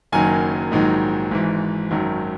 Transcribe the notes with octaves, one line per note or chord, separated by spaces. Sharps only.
F#1 F#2 D#3 F#3 G#5
A#1 G#2 D#3 F#3
G#1 G#2 E3
G#1 F#2 D#3 F#3